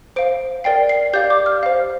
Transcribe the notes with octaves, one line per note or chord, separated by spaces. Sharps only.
C5 F5 D7
A#4 D5 G5 C7
C7
G4 D5 F5 G6
D6
F6
C5 F5